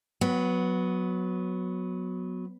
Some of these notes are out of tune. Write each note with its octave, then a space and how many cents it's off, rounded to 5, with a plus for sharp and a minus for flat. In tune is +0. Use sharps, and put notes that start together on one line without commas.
F#3 -15 B3 +0